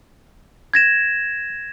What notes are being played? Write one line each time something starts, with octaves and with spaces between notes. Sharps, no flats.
G#6 A#6 E7